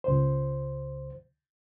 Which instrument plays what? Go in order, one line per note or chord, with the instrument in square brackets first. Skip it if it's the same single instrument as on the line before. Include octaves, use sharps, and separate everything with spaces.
[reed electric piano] C#2 C5